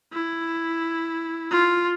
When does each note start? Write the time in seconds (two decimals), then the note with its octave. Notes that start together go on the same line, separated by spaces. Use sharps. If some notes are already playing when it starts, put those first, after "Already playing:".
0.13 E4
1.51 F4